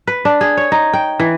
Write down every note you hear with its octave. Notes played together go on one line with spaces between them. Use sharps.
B4
D4
G#4
C#5
D#4
G5
E3